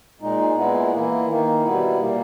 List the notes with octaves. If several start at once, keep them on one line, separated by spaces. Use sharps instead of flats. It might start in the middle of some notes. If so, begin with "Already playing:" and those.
A#2 G#3 D#4
A#2 G#3 B3 E4
E3 A#3 E4
D#3 A#3 D#4
B2 G3 B3 E4
A#2 G3 A#3